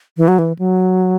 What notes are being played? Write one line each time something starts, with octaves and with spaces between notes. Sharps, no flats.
E3
F#3
E3
F#3